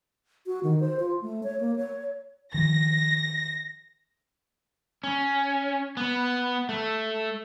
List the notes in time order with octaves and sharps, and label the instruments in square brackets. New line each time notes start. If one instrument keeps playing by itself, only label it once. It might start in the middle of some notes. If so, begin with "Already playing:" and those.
[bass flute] F#4
D#3
C5
F4
A3
C#5
A#3
C#5
[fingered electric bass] D#3 F3 [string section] A#6
[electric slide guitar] C#4
B3
A3